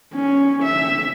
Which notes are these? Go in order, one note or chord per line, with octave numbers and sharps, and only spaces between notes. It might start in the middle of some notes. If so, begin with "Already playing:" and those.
C#4
E5